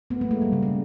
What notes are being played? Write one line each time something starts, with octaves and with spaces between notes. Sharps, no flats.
A3 B3
G#3 A#3
A3
G3
C#3
C#3